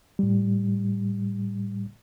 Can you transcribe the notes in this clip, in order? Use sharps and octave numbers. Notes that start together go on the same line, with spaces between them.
A2 G3